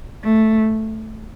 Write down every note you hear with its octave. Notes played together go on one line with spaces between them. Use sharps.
A3